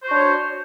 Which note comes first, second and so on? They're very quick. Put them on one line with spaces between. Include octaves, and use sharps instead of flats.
C5 F#4 D4 C#5